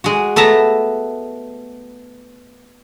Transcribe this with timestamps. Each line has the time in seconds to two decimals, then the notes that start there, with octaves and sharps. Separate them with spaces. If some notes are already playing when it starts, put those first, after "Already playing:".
0.04 G#3 F#4
0.36 A3 B3 E5 A5 A#5